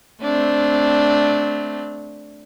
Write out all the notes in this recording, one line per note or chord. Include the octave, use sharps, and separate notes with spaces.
A3 C4 D4